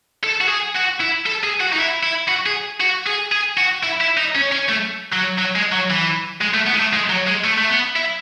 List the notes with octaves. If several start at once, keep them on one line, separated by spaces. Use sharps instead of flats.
A4
F#4
G#4
F#4
E4
A4
G#4
F#4
D#4
E4
E4
F#4
G#4
F#4
G#4
G#4
F#4
E4
E4
D#4
C#4
C#4
A3
F#3
F#3
G#3
F#3
E3
G#3
A3
B3
G#3
A3
G#3
F#3
G#3
A3
A3
B3
E4